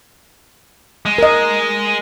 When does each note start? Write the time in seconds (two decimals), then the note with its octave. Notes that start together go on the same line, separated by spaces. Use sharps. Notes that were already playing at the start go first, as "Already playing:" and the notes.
1.06 G#3
1.18 A#4 D#5